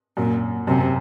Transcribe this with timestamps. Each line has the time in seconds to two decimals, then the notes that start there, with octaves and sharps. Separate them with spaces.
0.17 F#2 A#2
0.67 F#2 C3